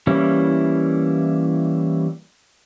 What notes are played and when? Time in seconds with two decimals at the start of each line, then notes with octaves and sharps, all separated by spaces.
0.07 E3 G3 A#3 C#4 E4